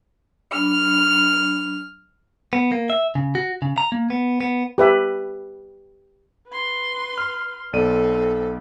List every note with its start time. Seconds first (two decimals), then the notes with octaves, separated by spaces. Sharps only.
0.52 F#3 D4 B5 F6
2.53 B3
2.72 A#3
2.90 E5
3.15 C#3
3.35 F#4
3.62 C#3
3.78 A#5
3.92 A#3
4.10 B3
4.41 B3
4.78 G4 B4 E5
6.48 B4 C6
7.18 F6
7.73 B1 C4 A4 D5 D#7